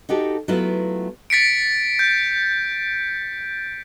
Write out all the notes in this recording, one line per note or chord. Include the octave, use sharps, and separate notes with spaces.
D#4 F#4 G4 A4
F#3 A3 B3 E4 F4
A6 B6 C#7 D7
G6